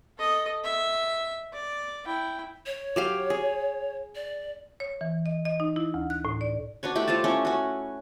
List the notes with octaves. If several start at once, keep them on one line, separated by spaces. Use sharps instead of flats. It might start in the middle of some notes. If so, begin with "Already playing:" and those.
A4 D#5
E5
D5
E4 G5
C#5
F#3 G4 F5
G#4
D5
C#5
E3
D#5
D#5
D#4
E4
D2
F#6
A2
D5
D4 F#4 B4 C#5
A3 E4 G4
F4 C5 F5 A5
A3 C#4 E4
C#4 F#4